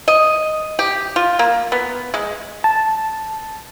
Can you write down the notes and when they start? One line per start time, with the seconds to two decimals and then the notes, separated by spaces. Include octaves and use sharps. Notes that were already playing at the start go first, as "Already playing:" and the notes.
0.08 D#5
0.79 G4
1.16 F4
1.39 A#3
1.72 B3
2.14 G#3
2.64 A5